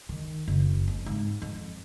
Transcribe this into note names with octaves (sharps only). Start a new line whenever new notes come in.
D#3
F#1
F2
G#2
F2